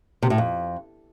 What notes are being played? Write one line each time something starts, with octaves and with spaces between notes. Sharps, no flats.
C3
A2
F2